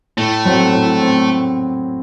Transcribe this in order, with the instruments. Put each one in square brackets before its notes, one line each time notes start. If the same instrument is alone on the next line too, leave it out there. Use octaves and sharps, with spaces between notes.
[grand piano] A2 [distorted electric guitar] A3
[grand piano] F#3 C4 F#4
A2
C4